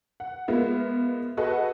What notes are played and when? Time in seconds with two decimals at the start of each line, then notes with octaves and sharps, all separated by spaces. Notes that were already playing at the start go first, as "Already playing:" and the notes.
0.20 F#5
0.48 G#3 A#3 B3 F4 E5
1.37 F#4 G#4 A4 B4 D#5 F#5